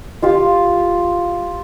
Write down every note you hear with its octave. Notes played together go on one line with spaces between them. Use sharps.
F4 G4 F5